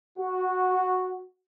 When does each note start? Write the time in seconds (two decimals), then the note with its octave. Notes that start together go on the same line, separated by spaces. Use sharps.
0.19 F#4